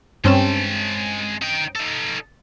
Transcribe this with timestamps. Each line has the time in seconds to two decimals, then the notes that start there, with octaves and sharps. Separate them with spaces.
0.24 G2 G#3 C4 C#4 A5
1.42 D#4 G5
1.76 D#4 A4